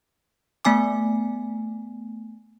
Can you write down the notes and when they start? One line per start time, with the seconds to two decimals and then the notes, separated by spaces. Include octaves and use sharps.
0.65 A3 B3 G#5 D6